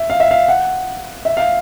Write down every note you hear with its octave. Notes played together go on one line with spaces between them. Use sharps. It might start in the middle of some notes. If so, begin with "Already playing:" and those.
Already playing: E5
F5
E5
F5
F#5
E5
F5